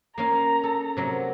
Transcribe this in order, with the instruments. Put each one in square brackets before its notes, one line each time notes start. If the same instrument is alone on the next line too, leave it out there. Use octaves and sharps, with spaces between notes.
[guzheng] A#3 C#4 F5 [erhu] A#5
[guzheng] A4
C3 F#3 A#3